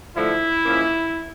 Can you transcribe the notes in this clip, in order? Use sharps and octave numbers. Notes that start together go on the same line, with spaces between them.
D3 F3 A3 E4
G#2 F3 A#3 C#4